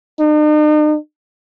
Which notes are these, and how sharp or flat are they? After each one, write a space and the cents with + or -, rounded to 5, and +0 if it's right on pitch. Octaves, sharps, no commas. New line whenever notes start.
D#4 -45